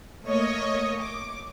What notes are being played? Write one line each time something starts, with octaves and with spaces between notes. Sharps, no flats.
A3 A#3 C#5 D#5
D6